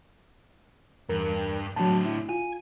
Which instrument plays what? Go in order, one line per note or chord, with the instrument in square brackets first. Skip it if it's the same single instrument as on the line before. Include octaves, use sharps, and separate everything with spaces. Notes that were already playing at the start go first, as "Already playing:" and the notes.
[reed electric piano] E2 A#4 [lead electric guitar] G2
[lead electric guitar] A2 D3 [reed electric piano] F#3 A5
[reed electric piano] E4
[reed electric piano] F4 [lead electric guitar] G#5